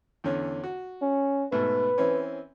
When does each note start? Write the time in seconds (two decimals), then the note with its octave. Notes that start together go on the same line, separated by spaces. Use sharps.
0.24 E2 D3 C#4
0.64 F#4
1.02 C#4
1.52 G#2 B2 A3 B4
1.98 E3 C4 C#4